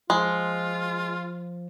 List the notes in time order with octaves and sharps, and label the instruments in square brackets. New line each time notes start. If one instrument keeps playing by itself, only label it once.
[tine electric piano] F3 [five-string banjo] G#3 [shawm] F4